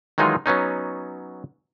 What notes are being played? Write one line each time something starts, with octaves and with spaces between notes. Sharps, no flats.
D#3 E3 F#3 G#3 D#4 F4
F#3 B3 C#4 D#4